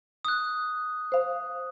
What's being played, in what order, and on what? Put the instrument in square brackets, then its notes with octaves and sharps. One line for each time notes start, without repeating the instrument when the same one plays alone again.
[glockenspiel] D#6 F#6
[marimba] C5 F5